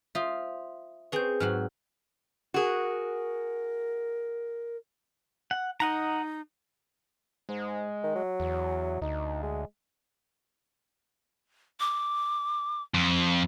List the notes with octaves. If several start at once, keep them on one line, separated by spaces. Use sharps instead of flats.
F4 C5 E5 D#6
C4 G#4 B4 C#5 G6
G#2 F#3 F#4 F6
F#4 G#4 A#4
F#5
D#4 D#5 F#5 A#5
G#2 G#3
D#3
F#3
E2
D2 D#4
G#3
D6
F2